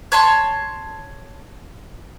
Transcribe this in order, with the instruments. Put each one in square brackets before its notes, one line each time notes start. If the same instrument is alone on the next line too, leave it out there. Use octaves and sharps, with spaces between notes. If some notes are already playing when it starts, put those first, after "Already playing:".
[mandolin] C#5 A5 C6